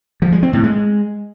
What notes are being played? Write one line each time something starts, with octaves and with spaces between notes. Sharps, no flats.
F3
G#3
C4
A2
G#3